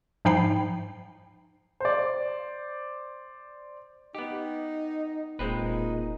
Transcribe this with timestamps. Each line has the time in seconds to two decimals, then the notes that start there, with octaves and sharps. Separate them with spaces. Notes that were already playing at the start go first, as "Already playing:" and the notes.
0.25 G#2 F3 D#4 G5 B5 C7
1.80 C5 D5
4.15 B3 D#4 G4
5.39 E1 A#2 G#3 C4 D#4 B4